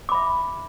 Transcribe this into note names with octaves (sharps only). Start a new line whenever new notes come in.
E5 B5 D6